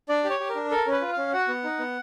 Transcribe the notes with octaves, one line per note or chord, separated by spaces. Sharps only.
D4 D5
G4
C#5
G4
A#4
D4
A4 A#4
C#4
B4
F4
C#4 F5
F#4 F#5
B3
D#4
B3